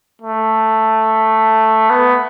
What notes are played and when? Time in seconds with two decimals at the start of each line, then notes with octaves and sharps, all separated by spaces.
0.22 A3
1.90 B3